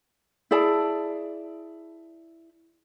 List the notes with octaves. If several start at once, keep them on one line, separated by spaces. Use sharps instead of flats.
E4 G#4 D5 A5